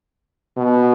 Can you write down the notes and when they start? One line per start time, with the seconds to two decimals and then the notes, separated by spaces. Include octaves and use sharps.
0.57 B2